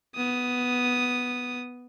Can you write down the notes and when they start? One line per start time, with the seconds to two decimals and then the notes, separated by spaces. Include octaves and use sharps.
0.16 B3 D#6